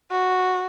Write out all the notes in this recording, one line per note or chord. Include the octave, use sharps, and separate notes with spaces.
F#4